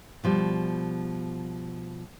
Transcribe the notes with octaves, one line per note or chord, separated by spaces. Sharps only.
B2 F3 G3